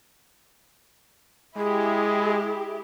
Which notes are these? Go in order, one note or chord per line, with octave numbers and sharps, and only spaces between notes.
G#3 E4 G4 G#4